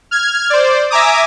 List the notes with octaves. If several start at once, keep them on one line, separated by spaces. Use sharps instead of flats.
F6 G#6
C5 D5
E5 G#5 A#5 D6 D#6